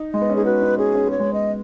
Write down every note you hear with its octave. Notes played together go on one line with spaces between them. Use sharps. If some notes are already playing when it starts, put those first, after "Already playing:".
Already playing: D#4
G#3 D#5
B3
C#4
D#4 G#4
F#4 B4
D#4
C#4 G#4
C#4
B3 C#5
G#3
B3 D#5